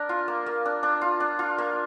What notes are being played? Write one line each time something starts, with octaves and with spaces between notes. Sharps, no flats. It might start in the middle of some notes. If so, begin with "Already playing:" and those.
Already playing: D4 A#4
F4
A#3
A#3
D4
D4
F4
D4
F4
A#3